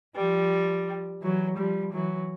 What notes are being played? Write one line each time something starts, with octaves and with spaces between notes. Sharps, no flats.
F3 G3
E3 F#3
F3 G3
E3 F#3